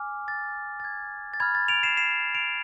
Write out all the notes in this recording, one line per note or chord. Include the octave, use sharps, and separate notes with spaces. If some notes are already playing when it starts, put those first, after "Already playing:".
Already playing: G#5 D6 F6
A6
A6
G#6
A6
B5 F6 G#6
A6
D7 F7
C7 E7
C7 E7
D7 F7